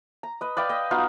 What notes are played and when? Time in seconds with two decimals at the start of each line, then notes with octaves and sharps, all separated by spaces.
0.23 A#5
0.41 B4 D#5
0.57 B4 D5 F5 G5
0.69 D#5 G5
0.91 B3 D#4 F4 F#4